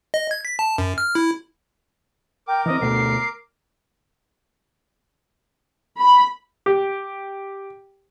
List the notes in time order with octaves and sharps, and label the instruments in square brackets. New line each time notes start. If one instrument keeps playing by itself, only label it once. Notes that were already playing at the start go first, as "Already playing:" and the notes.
[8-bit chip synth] D#5
G#6
B6
A5
F#2
F6
E4
[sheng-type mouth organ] A#4 D6 [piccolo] G5
[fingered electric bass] E3 C4 [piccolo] D#5
[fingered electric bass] D2 B2 A3 [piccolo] C7
[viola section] B5
[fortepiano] G4